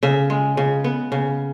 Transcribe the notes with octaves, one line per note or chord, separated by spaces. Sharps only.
C#3 E5
G#3
C#3
B3
C#3